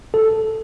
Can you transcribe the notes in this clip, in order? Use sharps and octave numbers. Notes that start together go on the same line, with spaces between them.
A4